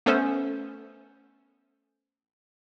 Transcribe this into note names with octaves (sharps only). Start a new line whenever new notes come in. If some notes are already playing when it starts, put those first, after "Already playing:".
A3 B3 C#4 A4 B4 C5